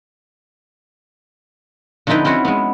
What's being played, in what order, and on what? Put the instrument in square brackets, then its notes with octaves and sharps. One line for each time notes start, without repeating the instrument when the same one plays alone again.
[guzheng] D3 F3 C4 D#4 E4 B4
C4 C#4 E4 F#4
G#3 B3